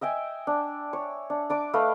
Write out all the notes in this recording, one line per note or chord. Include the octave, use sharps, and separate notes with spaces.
D#5 E5 G5 G#5
D4
C#5
D4
D4 D5 D6
A3 B4 D#5 F5